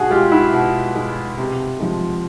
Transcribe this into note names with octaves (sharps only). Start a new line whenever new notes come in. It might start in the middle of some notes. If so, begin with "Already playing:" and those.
Already playing: B2 F#4 G#4
G#3 F4 G4
E4 F#4
B2
G#3
C3
F3 G#3